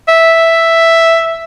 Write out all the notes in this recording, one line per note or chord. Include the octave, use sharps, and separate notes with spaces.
E5